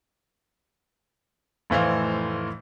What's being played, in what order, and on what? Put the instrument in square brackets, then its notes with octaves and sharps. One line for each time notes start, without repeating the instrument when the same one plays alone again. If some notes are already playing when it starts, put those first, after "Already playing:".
[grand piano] F1 A2 E3 C5 F5